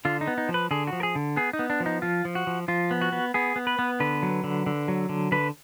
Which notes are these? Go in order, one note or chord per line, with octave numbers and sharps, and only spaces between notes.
D3 F4
D#4
B3
D#4
F3
B4
D3 G#4
F#4
F3
A#4
G#4
D3
B3 G#4
D#4
B3
D4
F3
D#4
F3 F4
F3
F#4
F3
F3 F4
B3
F#4
B3
B3 G#4
B3
B4
B3
D3 B4
F#3
D3
D3
F#3
D3
D3 B4